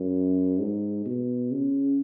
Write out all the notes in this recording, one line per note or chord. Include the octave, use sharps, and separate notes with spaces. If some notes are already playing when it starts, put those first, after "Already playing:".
Already playing: F#2
G#2
B2
C#3